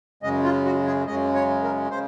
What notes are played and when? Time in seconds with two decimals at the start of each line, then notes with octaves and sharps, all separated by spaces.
0.23 F#2 C#3 G#3 D#5
0.44 F4
0.65 F#4
0.86 G#4
1.07 F#2 C#3 G#3 D#5
1.35 C#5
1.63 A#4
1.91 C#3 C5